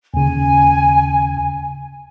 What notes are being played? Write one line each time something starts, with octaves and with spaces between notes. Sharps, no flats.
D#2 C#3 G#5